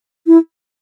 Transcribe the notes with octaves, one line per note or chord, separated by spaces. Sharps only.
E4